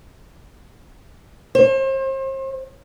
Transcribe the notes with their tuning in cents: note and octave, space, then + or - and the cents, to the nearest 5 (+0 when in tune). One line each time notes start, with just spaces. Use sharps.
C5 +40